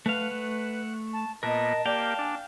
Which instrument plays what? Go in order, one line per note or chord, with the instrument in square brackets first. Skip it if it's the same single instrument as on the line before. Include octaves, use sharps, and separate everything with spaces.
[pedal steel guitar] A3 F5 [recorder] B4 [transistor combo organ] F#5
[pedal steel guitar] A3
[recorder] A5
[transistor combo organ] A#2 B3 [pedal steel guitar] A#4 [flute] D#5 [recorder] A5
[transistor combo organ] A#3 G4 [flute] D5 [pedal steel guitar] F5 G5
[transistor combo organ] D4 [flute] G#5